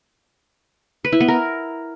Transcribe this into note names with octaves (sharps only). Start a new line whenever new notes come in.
B4
E4
B3
A#4